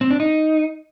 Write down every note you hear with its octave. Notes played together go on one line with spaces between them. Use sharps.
C4
D4
D#4